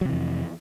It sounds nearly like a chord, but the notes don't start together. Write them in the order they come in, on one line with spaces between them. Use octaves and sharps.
F#3 C3 E3 F2